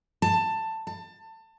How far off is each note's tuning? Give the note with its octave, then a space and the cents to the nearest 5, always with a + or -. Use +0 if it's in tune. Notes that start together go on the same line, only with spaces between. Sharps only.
A5 +15
A5 +25